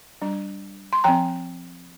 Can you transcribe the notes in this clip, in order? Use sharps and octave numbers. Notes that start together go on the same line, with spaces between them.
G3 D4
C6
F3 C4 G5 A#5